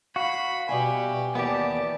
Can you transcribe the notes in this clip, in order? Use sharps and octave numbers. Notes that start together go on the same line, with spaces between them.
F#4 F5 B5 B6 C7
B2 G3 G4 E5 G#5
D#2 E3 B3 G4 D5 A5